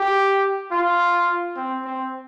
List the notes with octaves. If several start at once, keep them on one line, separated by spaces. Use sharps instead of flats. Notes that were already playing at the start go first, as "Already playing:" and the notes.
Already playing: G4
F4
C4
C4